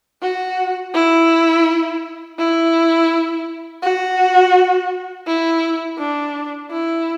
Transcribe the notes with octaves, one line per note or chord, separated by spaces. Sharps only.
F#4
E4
E4
F#4
E4
D4
E4